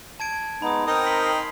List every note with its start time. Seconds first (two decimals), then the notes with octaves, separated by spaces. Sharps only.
0.20 A5 G#6 D7
0.62 G#3 B3 D#4 B5 D#6
0.87 C4 D#4 A#4 D#5 G5
1.06 C6 B6
1.26 C6 C7